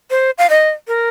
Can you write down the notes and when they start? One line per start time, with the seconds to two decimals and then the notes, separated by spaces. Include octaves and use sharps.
0.10 C5
0.38 F5
0.50 D#5
0.88 A#4